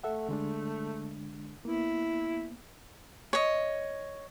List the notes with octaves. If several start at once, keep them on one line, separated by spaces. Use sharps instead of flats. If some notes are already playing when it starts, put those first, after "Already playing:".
A3 A4 E5 F#5
D3 G#3 D4
A#3 B3 E4
C#5 D#5